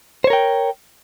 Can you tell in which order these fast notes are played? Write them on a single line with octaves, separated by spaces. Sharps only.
C5 C#5 A#4 G5